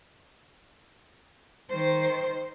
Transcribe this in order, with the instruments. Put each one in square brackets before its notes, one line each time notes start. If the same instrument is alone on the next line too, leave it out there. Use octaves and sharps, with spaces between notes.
[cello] D#3 C5